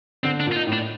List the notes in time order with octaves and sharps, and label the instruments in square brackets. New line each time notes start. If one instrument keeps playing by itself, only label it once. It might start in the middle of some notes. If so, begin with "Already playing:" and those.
[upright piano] D3 [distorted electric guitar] C4
[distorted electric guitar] D4
[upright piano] A#2
[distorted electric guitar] F4
D#4
[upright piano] A2
[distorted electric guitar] D4